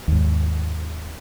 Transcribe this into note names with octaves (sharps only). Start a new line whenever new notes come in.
D#2 G#2